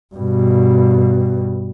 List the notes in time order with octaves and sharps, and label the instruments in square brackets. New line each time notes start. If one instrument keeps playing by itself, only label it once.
[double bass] G2 B2